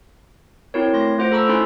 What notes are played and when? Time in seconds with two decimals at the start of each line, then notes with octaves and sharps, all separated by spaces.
0.74 C4 E4 F#4 A#4 C#5
0.94 A3 C6 A#6
1.18 A3 F4 C5 F#5 D7
1.32 A4 A#5 B5 C#6 E6
1.49 C#4 D#4 E4 A4 B5 C6